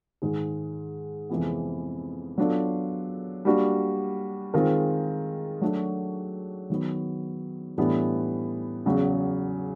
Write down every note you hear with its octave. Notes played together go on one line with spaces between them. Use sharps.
G#2 D#3 G#3
F2 C3 E3 G#3 B3
F#3 B3 D4 F4 A4
G3 A#3 D4 F#4
D#3 G#3 C4 F4 A#4
F#3 A3 D4 F#4
D#3 F#3 B3
A2 E3 G3 B3 D4
E2 C#3 F#3